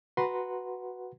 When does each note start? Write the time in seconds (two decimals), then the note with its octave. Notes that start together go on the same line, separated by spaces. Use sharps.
0.17 F#4 B4 F#5 A#5 C6